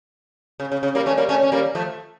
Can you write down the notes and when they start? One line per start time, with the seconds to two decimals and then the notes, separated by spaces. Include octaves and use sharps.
0.60 C#3
0.72 C#3
0.83 C#3
0.95 G3 A#3
1.06 A3 C#4
1.18 G3 A#3
1.29 A3 C#4
1.43 C#4
1.52 G3 A#3
1.75 F3 A3